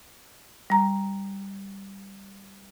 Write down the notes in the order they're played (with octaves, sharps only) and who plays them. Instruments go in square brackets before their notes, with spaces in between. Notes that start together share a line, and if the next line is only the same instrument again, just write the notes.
[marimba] G3 A#5